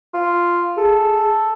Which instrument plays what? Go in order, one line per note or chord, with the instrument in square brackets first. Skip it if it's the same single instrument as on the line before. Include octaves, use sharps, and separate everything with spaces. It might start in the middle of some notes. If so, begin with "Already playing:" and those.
[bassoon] F4
[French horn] G#4 [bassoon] A4